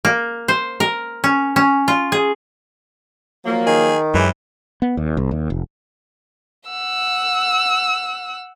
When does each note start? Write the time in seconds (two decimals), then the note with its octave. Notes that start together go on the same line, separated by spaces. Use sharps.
0.05 A#3
0.48 C5
0.80 A#4
1.24 C#4
1.56 C#4
1.88 F4
2.12 G#4
3.45 F3 F#3 A#3
3.67 D#3 G#4
4.14 F#2 E3 G#3 C#4 G4
4.82 B3
4.97 D#2
5.17 C2
5.31 D#2
5.50 F1
6.69 F#5 E6